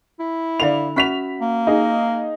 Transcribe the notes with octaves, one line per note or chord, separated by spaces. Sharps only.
E4
D3 D5 F5 B5 F7
C#4 F#4 E5 B5 B6 F7
A#3
D#4 G#4